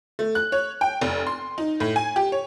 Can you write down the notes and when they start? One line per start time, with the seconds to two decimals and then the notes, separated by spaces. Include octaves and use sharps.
0.19 A3
0.35 F#6
0.52 C#5
0.81 G5
1.01 F1
1.27 C6
1.58 D#4
1.80 A2
1.96 G#5
2.16 G4
2.32 C#5